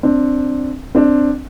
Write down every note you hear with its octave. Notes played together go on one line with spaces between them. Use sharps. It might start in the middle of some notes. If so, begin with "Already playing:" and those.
C4 D4
C4 D4